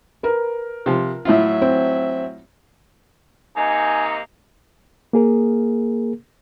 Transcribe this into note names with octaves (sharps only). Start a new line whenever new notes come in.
A#4 B4
C3 F3
A2 F#3 E4 F4 E5
C4
C3 A#3 D#4 G#5
A#3 G#4 A#4